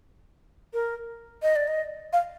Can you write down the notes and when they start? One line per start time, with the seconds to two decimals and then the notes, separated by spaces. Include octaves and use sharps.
0.73 A#4
1.43 D#5
1.56 D5
1.67 D#5
2.13 F5